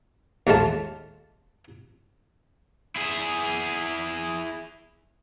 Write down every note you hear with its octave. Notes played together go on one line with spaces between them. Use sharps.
D#2 G#3 A3 F4 A5
E4 G#4